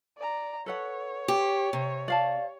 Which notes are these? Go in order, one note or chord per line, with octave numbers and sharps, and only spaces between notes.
D5 A#5
A4 B4 C#5 F#5
G4
C3
D5 F5 A5